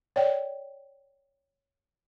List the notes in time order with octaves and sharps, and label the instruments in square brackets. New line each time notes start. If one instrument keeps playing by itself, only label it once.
[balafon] C#5 D5 F#5 G5